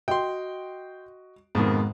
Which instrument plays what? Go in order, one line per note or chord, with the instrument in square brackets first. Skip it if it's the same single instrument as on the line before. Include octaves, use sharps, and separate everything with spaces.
[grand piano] F#4 D#5 [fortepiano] G5 C6
[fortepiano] F2 B2 D#3 [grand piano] G#2